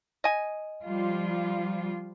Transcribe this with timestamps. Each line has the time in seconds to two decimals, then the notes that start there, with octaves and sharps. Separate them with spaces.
0.24 D#5 G#5
0.85 F3 G3 F4